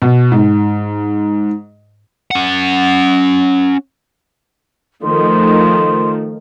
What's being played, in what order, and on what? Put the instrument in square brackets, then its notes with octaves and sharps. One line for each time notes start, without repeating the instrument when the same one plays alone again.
[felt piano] B2
G#2
[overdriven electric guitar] C#4 F#5
[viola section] D#3 F3 A3 [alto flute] C6